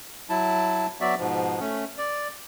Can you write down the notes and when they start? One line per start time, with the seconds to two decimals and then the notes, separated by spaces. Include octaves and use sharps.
0.30 F#3 E4 A5
1.01 F#3 B3 F#4 D5 E5
1.18 G#2 B2 F3
1.60 A3 C#4
1.98 D5